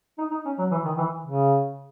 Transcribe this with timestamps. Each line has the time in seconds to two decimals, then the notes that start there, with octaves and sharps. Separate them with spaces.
0.18 D#4
0.31 D#4
0.45 C#4
0.58 F#3
0.71 E3
0.85 D#3
0.98 E3
1.25 C#3